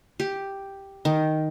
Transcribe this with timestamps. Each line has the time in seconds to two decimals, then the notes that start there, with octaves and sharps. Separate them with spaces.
0.20 G4
1.05 D#3